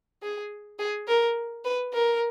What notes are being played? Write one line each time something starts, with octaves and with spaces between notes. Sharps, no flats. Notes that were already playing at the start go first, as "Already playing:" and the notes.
G#4
G#4
A#4
B4
A#4